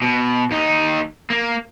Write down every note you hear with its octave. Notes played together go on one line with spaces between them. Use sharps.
B2
D#2 D#4
A#3